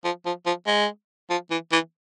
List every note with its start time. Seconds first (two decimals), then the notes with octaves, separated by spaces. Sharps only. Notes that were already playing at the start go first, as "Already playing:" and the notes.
0.05 F3
0.26 F3
0.46 F3
0.67 G#3
1.30 F3
1.51 E3
1.72 E3